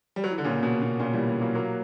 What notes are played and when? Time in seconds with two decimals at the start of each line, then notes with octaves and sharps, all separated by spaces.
0.16 G3
0.24 F#3
0.31 E3
0.38 D3
0.44 A#2 C#3
0.63 B2
0.82 B2
1.00 A#2 C#3
1.13 E3 G3
1.28 E3 G3
1.41 F#3 A#3
1.55 F#3 A#3